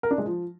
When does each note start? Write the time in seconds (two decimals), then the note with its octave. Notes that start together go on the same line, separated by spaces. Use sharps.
0.03 A#4
0.11 D4
0.18 G#3
0.26 F3